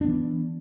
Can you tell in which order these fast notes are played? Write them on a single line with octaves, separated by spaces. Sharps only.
D4 B3 E3